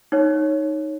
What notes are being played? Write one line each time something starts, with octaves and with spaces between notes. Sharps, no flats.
D#4 C#5